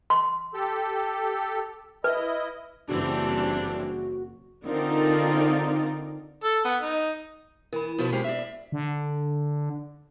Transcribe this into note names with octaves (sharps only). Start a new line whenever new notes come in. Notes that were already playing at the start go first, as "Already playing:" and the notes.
C6
G4 A4
E4 B4 D#5
F#1 C#3 E3 G3 C4 D4 F#4
D3 C4 D#4 F4 A#4 D5
A4
B3
D#4
E3 A#4 B5
B2 F3 B3 F#4 A#4
G#3 C#4 G4 C5 C7
D5 E5
D3